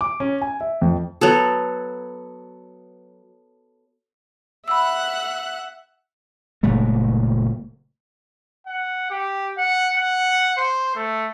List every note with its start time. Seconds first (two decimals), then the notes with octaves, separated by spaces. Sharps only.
0.01 D6
0.20 C#4
0.41 G#5
0.61 E5
0.82 F2
1.21 F#3 B3 A4
4.68 E5 F#5 B5 E6 F#6
6.63 F#1 A#2 G#3 A3
8.67 F#5
9.10 G4
9.57 F#5
9.96 F#5
10.57 C5
10.95 A3